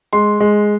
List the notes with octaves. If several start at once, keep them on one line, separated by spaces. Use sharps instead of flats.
G#3 C6
G#3